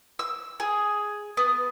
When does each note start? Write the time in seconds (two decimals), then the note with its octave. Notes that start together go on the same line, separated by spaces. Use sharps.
0.19 E6
0.60 G#4
1.37 B3